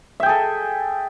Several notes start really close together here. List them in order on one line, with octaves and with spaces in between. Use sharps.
E5 G5 G#4 A4